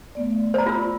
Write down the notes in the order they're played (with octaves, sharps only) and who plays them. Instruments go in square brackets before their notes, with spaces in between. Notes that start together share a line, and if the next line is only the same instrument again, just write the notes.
[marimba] A3 B3 D5
[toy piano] C5 A#5 [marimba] D5
[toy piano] F4 E6